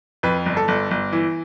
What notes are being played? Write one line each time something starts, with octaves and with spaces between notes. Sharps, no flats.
F2 B4
G1
A4
G1
G1
E3